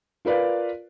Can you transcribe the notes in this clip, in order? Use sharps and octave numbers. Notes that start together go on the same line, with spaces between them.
F4 A#4 B4 D5 F5